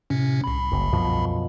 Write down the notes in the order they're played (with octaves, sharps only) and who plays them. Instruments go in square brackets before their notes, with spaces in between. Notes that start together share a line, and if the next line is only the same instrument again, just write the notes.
[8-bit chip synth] A2 C3 C#4
C2 B5
[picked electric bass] F#1
F#2 B2 F3